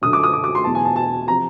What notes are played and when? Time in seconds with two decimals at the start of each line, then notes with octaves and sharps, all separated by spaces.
0.02 F#2 D3 F#3 D#6
0.13 D6
0.24 D#6
0.33 D6
0.44 D6
0.55 C6
0.64 E2 B2 F#3 A5
0.75 G#5
0.85 A5
0.96 A5
1.28 C3 F3 A#5